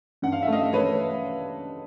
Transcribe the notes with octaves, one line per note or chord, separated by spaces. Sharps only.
G2 F#5
F5
E5
A3
D#5 F5
A3 B4 C#5